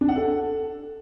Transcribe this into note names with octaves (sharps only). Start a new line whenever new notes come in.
D4
F#5
A4